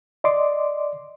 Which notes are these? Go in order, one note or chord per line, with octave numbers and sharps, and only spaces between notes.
D5 D#5 C6 D6